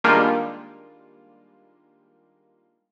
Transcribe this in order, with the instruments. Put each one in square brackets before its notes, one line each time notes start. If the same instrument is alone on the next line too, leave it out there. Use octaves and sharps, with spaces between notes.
[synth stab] D#3 G3 G#3 A#3 D4 F4